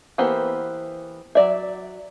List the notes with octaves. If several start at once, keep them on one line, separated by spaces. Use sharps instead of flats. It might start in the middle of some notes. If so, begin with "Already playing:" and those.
E3 A#3 B3 G4 C5
F#3 D5 E5